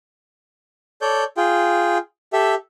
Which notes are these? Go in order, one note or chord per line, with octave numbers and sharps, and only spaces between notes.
A4 C#5 D5 G6
F4 G#4 G5
G4 A4 E5